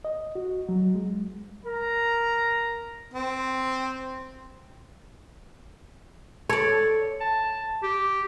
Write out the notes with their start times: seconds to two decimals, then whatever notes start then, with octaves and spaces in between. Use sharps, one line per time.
0.05 D#5
0.35 F#4
0.69 F#3
0.95 G#3
1.65 A#4 A#5
3.14 C4
6.49 A4 C#5 D5
7.21 A5
7.83 G4